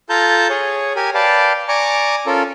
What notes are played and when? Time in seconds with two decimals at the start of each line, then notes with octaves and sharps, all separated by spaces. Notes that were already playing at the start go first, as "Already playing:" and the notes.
0.10 F4 A4 A5 A#5 G6
0.50 G#4 C#5
0.96 G4 A#4 G#5
1.15 B4 D5 F5 G5 A5
1.68 D5 G#5 A#5 C#6 D6
2.26 C#4 F4 A4 A#4